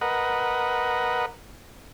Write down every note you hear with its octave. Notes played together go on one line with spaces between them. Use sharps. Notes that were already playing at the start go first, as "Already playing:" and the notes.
A#4 B4 D#5 F#5